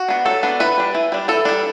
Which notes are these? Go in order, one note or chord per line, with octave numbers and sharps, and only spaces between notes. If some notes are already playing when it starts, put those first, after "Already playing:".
Already playing: F#4
B3 D4
F#3 A4
B3 D4
E3 B4
G3 D4
E3
G3 D4
E3 A4
G3 D4